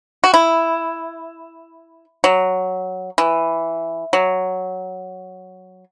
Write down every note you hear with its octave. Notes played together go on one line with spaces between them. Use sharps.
F#4
E4
F#3
E3
F#3